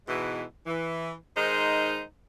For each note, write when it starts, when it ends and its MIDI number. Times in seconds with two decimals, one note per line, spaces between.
0.08 0.44 44
0.08 0.44 47
0.08 0.44 52
0.08 0.44 56
0.08 0.44 64
0.66 1.13 52
1.36 2.02 51
1.36 2.02 56
1.36 2.02 63
1.36 2.02 72